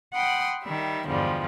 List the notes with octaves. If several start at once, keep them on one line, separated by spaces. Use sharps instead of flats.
F#5 G5 B5 C6 D#6
D#3 G3 E5
E2 G2 D3 F3 G3 G#3